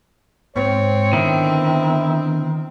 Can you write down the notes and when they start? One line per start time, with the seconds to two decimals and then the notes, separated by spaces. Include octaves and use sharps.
0.56 G#2 C4 C#5
1.13 D3 D#3 B3 E4